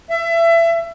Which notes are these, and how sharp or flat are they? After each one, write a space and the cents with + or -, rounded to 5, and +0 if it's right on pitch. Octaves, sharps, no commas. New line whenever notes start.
E5 +25